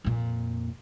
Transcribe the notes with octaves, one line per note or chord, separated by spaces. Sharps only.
F2 A#2